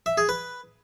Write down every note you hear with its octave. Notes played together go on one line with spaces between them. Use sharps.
E5
G#4
B4